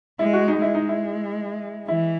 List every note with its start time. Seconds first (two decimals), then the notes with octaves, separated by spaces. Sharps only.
0.19 G#3 E4
0.33 F#4
0.48 D#4
0.62 G#3 E4
0.75 D#4
0.89 E4
1.88 E3 E4